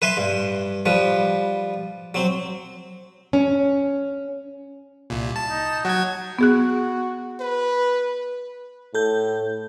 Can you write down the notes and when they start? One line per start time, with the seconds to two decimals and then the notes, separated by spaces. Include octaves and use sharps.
0.02 B4 E5 G#5 B5 C6
0.17 G2
0.85 F3 G3 B4
2.14 F#3 C4
3.33 C#4
5.10 C2 A#2
5.36 A5
5.50 D#4
5.85 F#3 F#5 G#6
6.39 B3 F#4 G#4 F#6
7.40 B4
8.95 A2 A4 G6